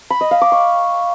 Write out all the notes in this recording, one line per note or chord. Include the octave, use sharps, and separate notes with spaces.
B5
D#5
F5
D6
C#6